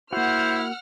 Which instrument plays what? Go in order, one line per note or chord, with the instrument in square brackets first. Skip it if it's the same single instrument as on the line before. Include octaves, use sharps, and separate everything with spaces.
[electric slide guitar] A#3 F#4 [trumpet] E4 [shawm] C5 [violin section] F#5 F6